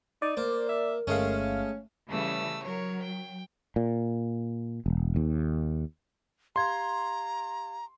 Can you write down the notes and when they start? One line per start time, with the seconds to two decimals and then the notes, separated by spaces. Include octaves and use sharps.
0.22 D#4 D5
0.37 A#3 A#4 C5
0.69 E5
1.07 G1 G#3 A3 C#4 G#4 F5
2.09 C#3 E3 G3 A3 E6
2.63 F#3 A#4 C#5
3.02 G5
3.76 A#2
4.86 E1
5.16 D#2
6.56 G4 F5 A#5 C6 G#6